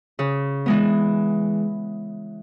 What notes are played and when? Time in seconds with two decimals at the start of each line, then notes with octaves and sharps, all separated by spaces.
0.19 C#3
0.66 E3 G#3 B3